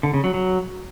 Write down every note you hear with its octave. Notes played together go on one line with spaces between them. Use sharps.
D3
C#3
F#3
F#3